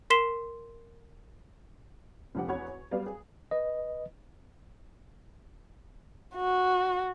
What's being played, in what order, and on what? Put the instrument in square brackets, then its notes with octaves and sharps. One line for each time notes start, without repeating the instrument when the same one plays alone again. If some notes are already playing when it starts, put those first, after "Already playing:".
[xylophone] A#4 C6 B6 C7 E7 G7
[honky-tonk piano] F1 D3 F3 G4 F#5
E2 F#4 C#5 F#5 B5 G#6
C#5
F#3 G3 B3 B4 D5 F5
G#4
[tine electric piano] B4 D#5
[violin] F#4